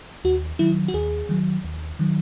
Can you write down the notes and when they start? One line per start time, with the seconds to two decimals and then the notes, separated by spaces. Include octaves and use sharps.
0.24 D#2 F#4
0.59 D#3 F#3 E4
0.88 F#4
0.94 D#2 G#4
1.29 D#3 F#3
1.64 D#2
1.99 D#3 F#3